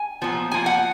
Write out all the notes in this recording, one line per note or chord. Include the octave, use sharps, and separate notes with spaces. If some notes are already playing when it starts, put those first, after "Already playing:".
Already playing: G#5
A#2 F3 B3
F3 A#3 G#5
F#5